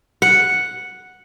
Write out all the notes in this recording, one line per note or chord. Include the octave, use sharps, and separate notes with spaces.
F#5